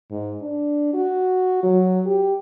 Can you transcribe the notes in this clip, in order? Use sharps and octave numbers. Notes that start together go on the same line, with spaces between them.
G#2
D4
F#4
F#3
G4